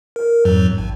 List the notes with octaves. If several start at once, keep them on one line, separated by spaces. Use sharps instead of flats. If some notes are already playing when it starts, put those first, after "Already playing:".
A#4
F2 G#2 F#3
G#1